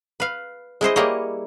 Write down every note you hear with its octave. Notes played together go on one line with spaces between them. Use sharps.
B4 F5
G#3 E4 C5 D#5
G3 A#3 E4 G#4 C#5 D#5